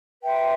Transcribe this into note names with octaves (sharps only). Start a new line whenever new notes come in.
B4 E5 G5 C6